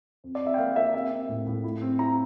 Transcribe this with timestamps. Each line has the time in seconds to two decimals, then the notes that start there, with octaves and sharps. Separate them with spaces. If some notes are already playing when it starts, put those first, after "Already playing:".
0.24 F2
0.35 D5
0.41 F2
0.47 E5
0.54 G5
0.58 A#3 F5
0.76 A#3 E5
0.94 C4 E5
1.11 C4
1.29 A2
1.47 A2
1.64 E4
1.82 C4
1.99 E4 A#5